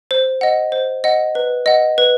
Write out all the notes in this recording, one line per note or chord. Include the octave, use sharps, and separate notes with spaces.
C5
D#5 F#5
C5
D#5 F#5
B4
D#5 F#5
B4